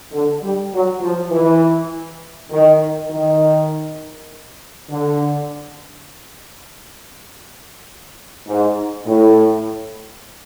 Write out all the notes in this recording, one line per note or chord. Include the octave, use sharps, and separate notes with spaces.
D3
G3
F#3
F3
E3
D#3
D#3
D3
G#2
A2